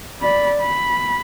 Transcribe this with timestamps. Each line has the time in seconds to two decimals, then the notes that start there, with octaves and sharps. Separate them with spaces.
0.22 D5 B5
0.60 B5